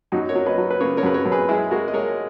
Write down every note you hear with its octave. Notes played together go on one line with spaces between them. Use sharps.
F#2 D#4 F#4
A#4 C#5
F#3
B4 D#5
F#3
B4
C#3 A#4 C#5
A#4 C#5
F#2 B4
A#4 C#5
F#2
G#4 B4
G#3 E4 G#4
G#3 F#4 A#4
D#5
G#3 A#4 C#5